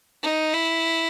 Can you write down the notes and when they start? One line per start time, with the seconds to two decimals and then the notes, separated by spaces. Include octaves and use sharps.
0.23 D#4
0.53 E4